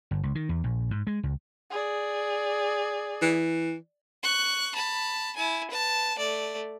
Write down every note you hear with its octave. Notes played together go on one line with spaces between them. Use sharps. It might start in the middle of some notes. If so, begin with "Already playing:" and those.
G1
C#2
D#3
E2
A#1
G#2
G#3
C#2
G#4 D5
E3
C#6 F#6
A5 B5
E4 G#5
B4 A5
A3 D5